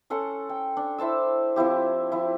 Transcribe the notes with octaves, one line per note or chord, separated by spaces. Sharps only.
C#4 A4 F#5 C6
G5
D4
E4 C5 A5 E6
F3 C4 E4 G4
F3 E4